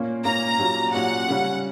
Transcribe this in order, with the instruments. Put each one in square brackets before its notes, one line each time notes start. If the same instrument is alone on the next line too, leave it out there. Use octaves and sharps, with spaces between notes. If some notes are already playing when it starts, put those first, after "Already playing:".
Already playing: [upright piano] A#2 A#3 C#4
[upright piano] A#2 A#3 C#4 [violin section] A#5
[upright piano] A#2 F#3 C#4 G4
[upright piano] A#2 F#3 C#4 G4 [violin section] F#5
[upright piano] C#3 G3 C#4